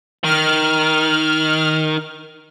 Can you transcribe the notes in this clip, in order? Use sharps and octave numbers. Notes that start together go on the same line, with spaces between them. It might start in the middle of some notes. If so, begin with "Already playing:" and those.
D#3 F6